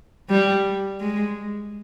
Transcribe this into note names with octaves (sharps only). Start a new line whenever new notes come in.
G3
G#3